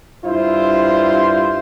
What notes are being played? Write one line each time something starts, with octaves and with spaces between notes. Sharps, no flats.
G2 E4 F4 C5